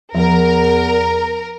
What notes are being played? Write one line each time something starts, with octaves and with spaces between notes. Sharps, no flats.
E2 F3 A#4